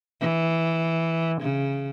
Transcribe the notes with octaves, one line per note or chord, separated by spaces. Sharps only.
E3
C#3